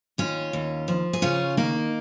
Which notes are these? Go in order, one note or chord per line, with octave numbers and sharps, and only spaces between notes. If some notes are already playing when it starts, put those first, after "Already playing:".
D#2 C#4 F4
D#2
F3
G#4
C#3 C#4 F4
D#3 A#3 D#4